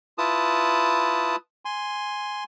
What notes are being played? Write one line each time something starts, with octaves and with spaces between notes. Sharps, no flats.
E4 F4 B4 A5 D#6
G#5 C6